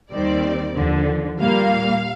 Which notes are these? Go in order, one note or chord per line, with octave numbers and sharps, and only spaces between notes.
D#2 D#3 G3 C4 D5
D#2 D3 F3
A#2 G3 A#3 F5